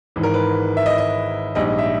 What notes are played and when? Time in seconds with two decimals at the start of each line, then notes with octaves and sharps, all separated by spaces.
0.16 G#1 G#2 E3
0.23 A#4
0.34 B4
0.77 E5
0.86 D#5
0.98 D#5
1.55 A#1 G#2 G3 D#5
1.68 D#5
1.79 E5